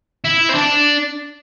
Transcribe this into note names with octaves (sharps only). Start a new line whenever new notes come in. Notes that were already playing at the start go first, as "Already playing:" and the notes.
E4
C4
D4